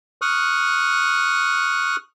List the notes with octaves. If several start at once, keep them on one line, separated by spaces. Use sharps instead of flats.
C#6 D#6 F6 F#6